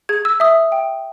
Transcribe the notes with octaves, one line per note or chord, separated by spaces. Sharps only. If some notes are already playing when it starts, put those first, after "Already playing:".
G#4 G#6
E6
E5 D#6
G5